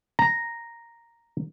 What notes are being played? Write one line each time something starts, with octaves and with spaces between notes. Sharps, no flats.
A#5